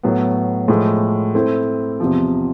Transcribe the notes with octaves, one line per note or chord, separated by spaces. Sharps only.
A2 F#3 B3
A2 F3 G#3
A3 C4 E4
E2 C3 F3